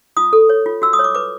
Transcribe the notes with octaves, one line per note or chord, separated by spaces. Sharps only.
F4 D#6
A4
C#5
F4
F#4 E6
D#6
C#5
D6
B4 D6